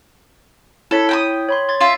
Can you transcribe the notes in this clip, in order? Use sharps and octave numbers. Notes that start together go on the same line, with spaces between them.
E4 A4 C#5 B6
G5 A#5 D#6
C#5 B5 C6
C6 G#6 A6
F4 E5